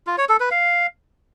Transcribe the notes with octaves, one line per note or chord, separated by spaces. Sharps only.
F4
C#5
A4
B4
F5